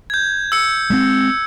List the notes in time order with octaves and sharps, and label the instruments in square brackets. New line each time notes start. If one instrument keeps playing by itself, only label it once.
[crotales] G6 G#6
E6 C#7
[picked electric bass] G#3 B3 C4